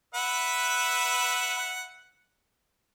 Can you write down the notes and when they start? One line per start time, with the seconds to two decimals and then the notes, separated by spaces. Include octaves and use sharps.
0.15 B4 E5 F#5